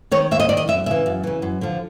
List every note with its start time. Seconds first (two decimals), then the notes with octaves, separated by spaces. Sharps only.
0.11 D#3 C#5
0.31 D#2 E5
0.40 D#5
0.49 D#3 D5
0.57 D#5
0.68 F#2 E5
0.86 C#3 E3 E5
1.06 F#2
1.24 C#3 E3
1.42 F#2
1.61 D3 F3